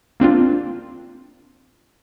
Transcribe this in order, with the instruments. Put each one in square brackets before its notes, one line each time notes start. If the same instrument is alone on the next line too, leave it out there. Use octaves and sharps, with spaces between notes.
[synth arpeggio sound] A#3 C4 D4 F4